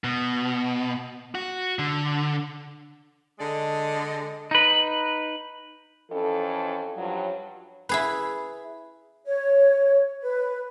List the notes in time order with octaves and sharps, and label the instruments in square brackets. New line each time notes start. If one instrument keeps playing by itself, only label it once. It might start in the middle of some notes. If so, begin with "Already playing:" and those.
[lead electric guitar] B2
F#4
D3
[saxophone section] D3 G#3 D5 D#5
[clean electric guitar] D#4 B4
[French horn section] F2 E3 C#4 A4
G2 F3 F#3
[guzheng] E4 G#4 B4
[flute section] C#5
B4